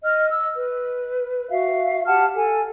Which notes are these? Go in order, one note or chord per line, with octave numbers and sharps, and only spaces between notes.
D#5 F6
E6
B4
F#4 E5 F5
G4 F#5 A5 F6
A4 G#5